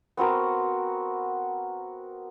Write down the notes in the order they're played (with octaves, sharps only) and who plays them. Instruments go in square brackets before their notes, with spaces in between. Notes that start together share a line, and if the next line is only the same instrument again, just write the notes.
[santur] B3 C4 F#4 A#4